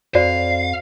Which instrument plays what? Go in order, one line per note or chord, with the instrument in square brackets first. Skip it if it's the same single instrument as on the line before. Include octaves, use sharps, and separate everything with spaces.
[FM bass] F2 [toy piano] F#4 C5 D5 [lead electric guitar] F5